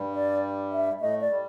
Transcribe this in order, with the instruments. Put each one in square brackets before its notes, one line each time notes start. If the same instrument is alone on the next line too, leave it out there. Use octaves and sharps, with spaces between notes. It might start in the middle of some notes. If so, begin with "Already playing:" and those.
Already playing: [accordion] G2 G3
[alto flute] D5
E5
[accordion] A2 A3 [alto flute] D#5
[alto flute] D5
[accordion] G3